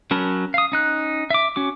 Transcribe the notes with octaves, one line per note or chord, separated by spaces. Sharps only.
F#3 C#4 A#4 A5 B5
F5 D#6
C#4 D#4 F#6
E5 D6
C#4 F#4 D6